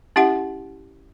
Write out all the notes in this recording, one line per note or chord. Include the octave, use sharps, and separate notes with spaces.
C#4 E4 G4 E5 F#5 C6